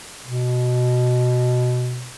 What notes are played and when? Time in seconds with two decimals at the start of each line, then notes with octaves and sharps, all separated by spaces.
0.24 B2